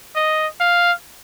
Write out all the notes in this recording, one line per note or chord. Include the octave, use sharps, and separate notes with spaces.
D#5
F5